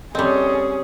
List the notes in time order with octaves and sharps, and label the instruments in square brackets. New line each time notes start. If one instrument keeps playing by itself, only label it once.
[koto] G3 C4 [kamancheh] C#4 G#4 [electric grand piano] A4 D#5